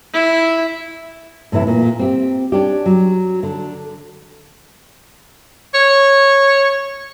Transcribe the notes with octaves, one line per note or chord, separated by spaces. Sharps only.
E4
A2 C3 E3 E4
A#2
C4 G4
C#4 D4 G4
F#3
D3
C#5